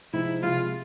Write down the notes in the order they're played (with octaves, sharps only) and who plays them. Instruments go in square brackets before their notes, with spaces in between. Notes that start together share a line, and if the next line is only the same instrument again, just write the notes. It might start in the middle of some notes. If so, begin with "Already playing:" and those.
[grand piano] C3 F3 G#3 C4 D#4 [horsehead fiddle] E4
[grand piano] C3 F3 G#3 [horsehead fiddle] F4